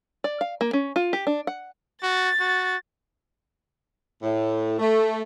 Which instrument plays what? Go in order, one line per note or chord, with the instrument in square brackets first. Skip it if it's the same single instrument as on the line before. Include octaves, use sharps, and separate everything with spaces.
[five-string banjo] D5
F5
A#3
C#4
F4
G4
D4
F#5
[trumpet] F#4 [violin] A6
[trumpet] F#4
[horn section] A2
A3